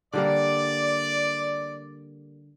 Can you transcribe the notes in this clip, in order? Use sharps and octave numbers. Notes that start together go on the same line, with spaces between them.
D3 G3 A#3 D5